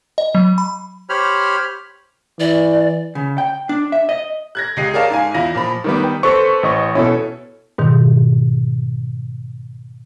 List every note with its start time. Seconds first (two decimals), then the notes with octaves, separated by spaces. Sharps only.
0.18 D#5
0.35 F#3
0.58 B5
1.10 G4 C5 C#5 B5 F6
2.40 E3 D5
3.15 C#3
3.38 G5
3.69 D4
3.92 E5
4.09 D#5
4.55 F#6 G#6 A#6
4.76 C#2 G4 D#5 C7 D#7
4.94 G#4 A#4 C#5 D5 F5 A5
5.10 G#2 F5 G#5
5.34 E2 E4 F4 A#6
5.55 A#2 F3 B5
5.84 D#3 G3 B3
6.01 B4 G5
6.23 C4 A4 B4 C#6
6.63 A1 D#5 C#6
6.95 B2 C#4 E4 A4
7.78 G#2 B2 D#3